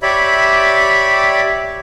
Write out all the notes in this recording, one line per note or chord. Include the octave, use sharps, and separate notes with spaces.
G4 C#5 D5 E5 B5